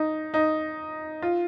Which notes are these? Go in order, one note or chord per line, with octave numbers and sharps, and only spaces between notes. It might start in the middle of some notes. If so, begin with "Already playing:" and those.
Already playing: D#4
D#4
F4